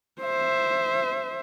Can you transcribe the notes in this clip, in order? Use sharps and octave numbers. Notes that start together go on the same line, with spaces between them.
C5 E5